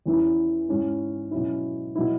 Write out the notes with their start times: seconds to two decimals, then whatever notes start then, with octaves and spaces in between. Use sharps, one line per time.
0.06 E2 E3 C#4 E4
0.69 G#2 G#3 C#4 E4
1.31 B2 F#3 C#4 E4
1.95 B2 F#3 E4